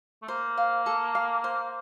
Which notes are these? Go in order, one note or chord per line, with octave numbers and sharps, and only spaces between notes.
A3
A#3 C5
F5
A4
F5
C5